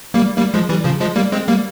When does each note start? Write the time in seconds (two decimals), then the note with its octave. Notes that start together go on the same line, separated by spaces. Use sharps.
0.14 G3 A#3
0.37 G3 A#3
0.54 F3 G#3
0.69 E3 G3
0.84 C#3 F3
1.01 F3 G#3
1.16 G3 A#3
1.32 G#3 C4
1.48 G3 A#3